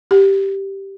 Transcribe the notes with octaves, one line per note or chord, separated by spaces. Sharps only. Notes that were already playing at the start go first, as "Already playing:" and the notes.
G4